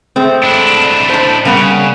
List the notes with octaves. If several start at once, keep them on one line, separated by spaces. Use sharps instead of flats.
G#3 A3 C4
D4 E4
C5 A5
C#3 G3 A#3 B3